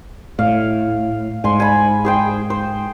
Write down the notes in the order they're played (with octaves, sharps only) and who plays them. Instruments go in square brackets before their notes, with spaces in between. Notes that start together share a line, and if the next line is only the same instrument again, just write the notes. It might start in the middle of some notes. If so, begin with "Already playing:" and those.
[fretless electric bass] A2 [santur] F5
[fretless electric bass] G#2 [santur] G#5 C6
[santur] G#5 B5
G#4 C5 G5
C5